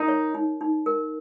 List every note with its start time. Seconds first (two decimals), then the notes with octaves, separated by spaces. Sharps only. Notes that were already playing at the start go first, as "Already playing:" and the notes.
Already playing: D#4 A#4
0.08 C#5
0.34 D#4
0.61 D#4
0.86 A#4